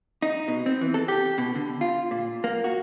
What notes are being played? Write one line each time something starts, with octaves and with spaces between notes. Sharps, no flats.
D#4
B2
C4
E3
A4
G4
B2
D3
F4
A#2
A#3
F#4